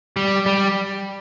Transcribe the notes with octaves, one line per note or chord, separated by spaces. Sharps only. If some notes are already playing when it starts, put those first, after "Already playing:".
G3
G3